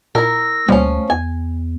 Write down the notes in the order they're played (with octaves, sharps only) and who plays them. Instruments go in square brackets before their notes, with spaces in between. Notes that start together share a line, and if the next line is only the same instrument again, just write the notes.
[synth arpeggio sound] A#2 [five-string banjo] E4 A#4 [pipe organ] E6 A#6
[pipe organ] D2 [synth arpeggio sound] B2 G3 A#3 [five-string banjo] F3 C#4
[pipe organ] E2 [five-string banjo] G#5